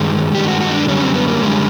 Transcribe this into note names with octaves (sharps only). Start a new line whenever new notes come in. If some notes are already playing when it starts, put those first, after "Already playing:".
Already playing: G2 D#3 G#3 G#4
G2 D#3 G#3 G4
F#4
F#4
D#4
D4
F#2 D3 G3 C#4
C4
B3
A#3
F#2 D3 G3 G#3